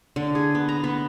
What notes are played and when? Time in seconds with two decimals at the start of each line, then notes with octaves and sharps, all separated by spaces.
0.16 D3
0.35 G#4
0.55 B3
0.69 A#5
0.84 B3